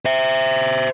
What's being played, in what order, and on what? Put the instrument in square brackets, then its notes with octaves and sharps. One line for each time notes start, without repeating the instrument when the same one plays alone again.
[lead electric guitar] C5 E5